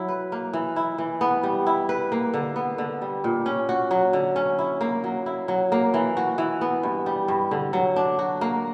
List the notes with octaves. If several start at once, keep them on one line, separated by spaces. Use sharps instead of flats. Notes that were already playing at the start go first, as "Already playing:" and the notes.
Already playing: F#3 E4
B4
A#3
E3
E4
E3
B3
G3
E4
B4
A#3
D3
B3
D3
G3
A#2
C#4
F#4
F#3
D3
C#4
E4
A#3
F#3
E4
F#3
A#3
E3
F#4
E3
B3
G2
G3
G2
D3
F#3
D4
F#4
A#3